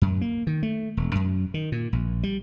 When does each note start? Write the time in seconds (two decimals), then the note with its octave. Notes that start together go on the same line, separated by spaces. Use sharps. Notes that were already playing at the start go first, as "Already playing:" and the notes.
0.02 F#2
0.21 A#3
0.47 D#3
0.63 A3
0.97 E1
1.15 F#2
1.54 D#3
1.72 A#2
1.93 A#1
2.23 G3